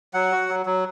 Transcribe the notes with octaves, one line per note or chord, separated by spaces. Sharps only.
F#3 F#5
F#4
F#3
F#3